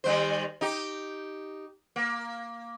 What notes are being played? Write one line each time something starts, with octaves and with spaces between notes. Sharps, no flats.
D#3 G3 C5
D#4 G4
A#3